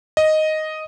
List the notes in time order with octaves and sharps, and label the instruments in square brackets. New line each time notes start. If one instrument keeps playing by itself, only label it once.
[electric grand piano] D#5